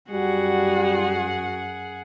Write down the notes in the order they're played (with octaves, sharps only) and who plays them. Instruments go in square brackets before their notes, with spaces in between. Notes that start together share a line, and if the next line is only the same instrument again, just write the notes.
[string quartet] F#2 G#4 F#5 [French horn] G3 [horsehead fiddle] F#4